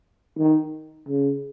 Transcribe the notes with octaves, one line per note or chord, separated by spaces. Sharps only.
D#3
C#3